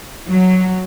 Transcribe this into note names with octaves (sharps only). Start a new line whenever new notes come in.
F#3